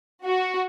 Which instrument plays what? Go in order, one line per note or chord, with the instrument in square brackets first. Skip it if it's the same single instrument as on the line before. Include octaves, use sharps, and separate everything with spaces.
[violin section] F#4